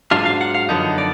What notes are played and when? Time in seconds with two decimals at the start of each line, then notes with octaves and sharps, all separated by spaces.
0.11 G#2 F#3 D4 F4 F5
0.26 F5
0.41 F#5
0.55 F5
0.69 F#2 D3 F3 B3 D#4
0.98 D5